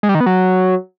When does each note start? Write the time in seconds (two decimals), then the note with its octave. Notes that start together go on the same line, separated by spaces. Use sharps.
0.03 G#3
0.09 G3
0.15 D#3
0.21 B3
0.26 F#3